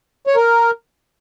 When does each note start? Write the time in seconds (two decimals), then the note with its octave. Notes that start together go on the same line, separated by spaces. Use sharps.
0.27 C#5
0.36 A#4